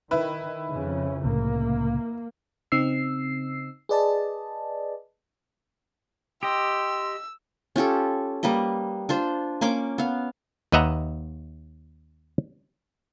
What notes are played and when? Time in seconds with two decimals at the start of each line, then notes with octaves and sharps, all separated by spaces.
0.11 D#3 E4 B4
0.68 F2 C#3 C#4
1.24 C2 A2 C#3 A#3
2.72 C#3 C4 D#4 E6 C7
3.89 G#4 B4 D5 D#5 A5
6.43 G4 D#5 G5 C6 E6
7.76 C#4 F4 G4 A4
8.43 G3 A#3 B4 D#5
9.09 D4 F4 C5
9.61 A#3 C#4 C6 D6
9.98 B3 F5
10.72 D#2 B4 D#5 E5 F#5 A#5